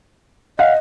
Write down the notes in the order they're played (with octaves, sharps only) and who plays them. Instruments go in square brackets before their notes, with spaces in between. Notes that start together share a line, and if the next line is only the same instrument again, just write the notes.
[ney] D#5 [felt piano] F5 F#5